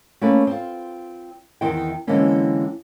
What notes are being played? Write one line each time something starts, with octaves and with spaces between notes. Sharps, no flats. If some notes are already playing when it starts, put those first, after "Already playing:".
A3 A#3 C#4 A#4 B4
C4 F4
E2 D#3 C4 E4 C5 G5
D3 E3 G#3 A#3 C4 C#4